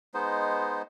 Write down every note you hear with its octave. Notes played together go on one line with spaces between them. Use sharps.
G#3 B3 D#4 C5